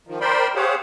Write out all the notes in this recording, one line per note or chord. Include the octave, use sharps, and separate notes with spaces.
D#3 F3
A#4 C5 D5 G5 B5 C6
G4 G#4 C5 C#5 F5 F#5